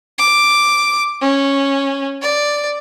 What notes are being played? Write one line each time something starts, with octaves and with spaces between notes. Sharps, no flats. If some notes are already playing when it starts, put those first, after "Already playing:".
D6
C#4
D5